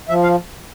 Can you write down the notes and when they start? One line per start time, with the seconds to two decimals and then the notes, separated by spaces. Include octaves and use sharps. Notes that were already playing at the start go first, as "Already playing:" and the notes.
0.09 F3 E5
0.23 F5